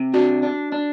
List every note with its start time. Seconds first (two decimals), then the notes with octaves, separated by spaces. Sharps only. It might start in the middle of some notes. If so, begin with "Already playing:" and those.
Already playing: C3
0.14 D4 F#4
0.43 D4
0.72 D4